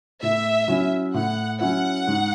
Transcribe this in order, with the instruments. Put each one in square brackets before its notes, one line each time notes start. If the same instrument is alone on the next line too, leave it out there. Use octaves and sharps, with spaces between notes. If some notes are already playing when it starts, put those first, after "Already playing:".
[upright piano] A2 [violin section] E5
[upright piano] F#3 C#4 E4
[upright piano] A2 [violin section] F#5
[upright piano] F#3 C#4 E4 [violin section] F#5
[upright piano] G#2